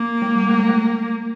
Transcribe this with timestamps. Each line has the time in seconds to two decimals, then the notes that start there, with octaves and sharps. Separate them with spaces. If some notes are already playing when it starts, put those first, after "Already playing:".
Already playing: A#3
0.22 G#3
0.35 G3
0.49 A3
0.59 G#3
0.69 A3